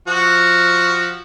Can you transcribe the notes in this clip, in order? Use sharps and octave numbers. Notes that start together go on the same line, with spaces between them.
F3 F#4